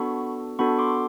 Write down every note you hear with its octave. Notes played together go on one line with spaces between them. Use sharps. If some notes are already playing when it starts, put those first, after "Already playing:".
Already playing: B3 D4 F#4 A4 B5 C#6
B3 D4 F#4 A4 B5 C#6
C6 D6